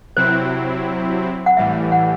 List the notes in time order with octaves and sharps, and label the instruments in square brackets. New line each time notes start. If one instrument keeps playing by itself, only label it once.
[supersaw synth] C3 F#3 C4 E4 [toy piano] C5
[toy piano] F#5
[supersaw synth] A2 E3 G3 [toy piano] E5
[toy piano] F#5